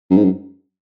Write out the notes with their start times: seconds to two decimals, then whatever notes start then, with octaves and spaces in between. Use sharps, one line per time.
0.10 F#2
0.17 G#2
0.24 F#2